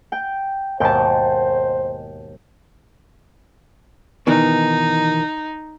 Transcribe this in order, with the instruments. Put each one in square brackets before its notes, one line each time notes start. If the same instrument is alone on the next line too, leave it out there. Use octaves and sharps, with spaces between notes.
[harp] G5
[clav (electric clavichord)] D#2 G#2 B2 [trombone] C5 [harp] G5 A5
[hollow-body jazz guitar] B2 D#3 E3 [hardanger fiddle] D#4